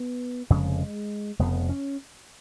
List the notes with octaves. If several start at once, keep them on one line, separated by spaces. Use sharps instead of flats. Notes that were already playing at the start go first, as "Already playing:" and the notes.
Already playing: B3
F1 F2 C#3 G#3
F1 F2 C#3 B3
C#4